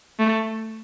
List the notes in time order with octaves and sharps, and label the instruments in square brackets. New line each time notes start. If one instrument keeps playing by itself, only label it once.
[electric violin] A3